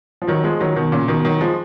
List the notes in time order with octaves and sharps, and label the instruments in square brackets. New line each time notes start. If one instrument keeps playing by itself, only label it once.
[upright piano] F3
D#3 F#3
F3 G#3
D#3 F#3
B2 D#3
A#2 C#3
B2 D#3
D#3 F#3
F3 G#3